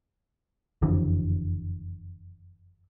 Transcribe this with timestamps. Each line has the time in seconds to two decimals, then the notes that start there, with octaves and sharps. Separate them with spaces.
0.82 F#1 F2 D3 E3